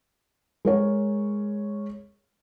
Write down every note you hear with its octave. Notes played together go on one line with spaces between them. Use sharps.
G#3 A#4 C#5